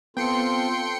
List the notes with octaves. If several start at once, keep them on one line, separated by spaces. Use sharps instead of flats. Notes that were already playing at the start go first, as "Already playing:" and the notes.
B3 C4 F4 A4 G5 C6 C#7